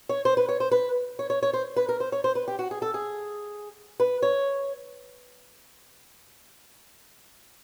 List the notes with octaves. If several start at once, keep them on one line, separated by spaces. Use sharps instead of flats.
C#5
C5
B4
C#5
C5
B4
C#5
C#5
C#5
C5
B4
A#4
C5
C#5
C5
B4
G4
F#4
G#4
A4
G#4
B4
C#5